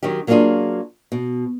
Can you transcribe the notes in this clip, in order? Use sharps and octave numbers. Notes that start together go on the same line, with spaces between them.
D#3 F#3 C#4 G4
F#3 A#3 C#4 D4 F4 G#4
B2